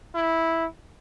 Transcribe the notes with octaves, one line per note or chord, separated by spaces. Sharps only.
E4